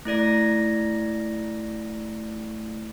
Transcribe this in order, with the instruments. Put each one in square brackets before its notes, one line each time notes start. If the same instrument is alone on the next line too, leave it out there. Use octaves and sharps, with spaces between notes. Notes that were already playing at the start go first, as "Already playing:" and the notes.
[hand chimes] A3 E4 D5 A#6